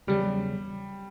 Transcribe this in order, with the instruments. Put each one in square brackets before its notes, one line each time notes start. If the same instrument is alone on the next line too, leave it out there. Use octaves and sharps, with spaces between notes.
[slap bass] E2 C#3 F#3 [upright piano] G3